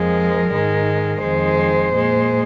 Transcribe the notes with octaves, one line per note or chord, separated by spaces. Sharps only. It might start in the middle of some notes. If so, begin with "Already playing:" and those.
Already playing: F2 F3 G#3 A#4
G#2 D#3 G#3
F2 D#3 G#3 C5
A#2 G#3